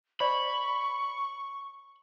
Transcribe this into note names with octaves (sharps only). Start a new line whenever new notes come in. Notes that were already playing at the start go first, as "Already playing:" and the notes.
C5 D5 D#5 B5 C#6